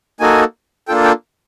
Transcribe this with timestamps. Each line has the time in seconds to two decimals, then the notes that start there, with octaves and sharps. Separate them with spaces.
0.20 A#3 D#4 F#4 A4 G#5
0.88 A#3 D4 F4 A4 G5
1.05 G5